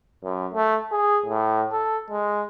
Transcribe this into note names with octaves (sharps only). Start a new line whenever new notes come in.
F#2
A3
G#4
A2
A4
G#3